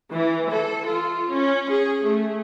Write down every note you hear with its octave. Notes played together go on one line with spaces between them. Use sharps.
E3
A4
F4
C#4
G#4
A3